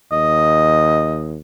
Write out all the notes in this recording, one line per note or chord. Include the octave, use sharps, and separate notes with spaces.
D#2 D#5